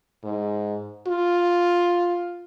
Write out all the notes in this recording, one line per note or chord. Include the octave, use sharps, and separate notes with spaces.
G#2
F4